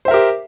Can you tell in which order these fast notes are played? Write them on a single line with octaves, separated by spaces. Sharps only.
C5 E5 A#4 G4